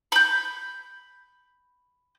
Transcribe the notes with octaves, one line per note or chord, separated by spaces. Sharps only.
B5 G6